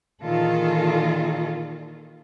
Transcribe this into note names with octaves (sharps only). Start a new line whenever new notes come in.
A#2 D#3 E3 F4 G#4 A4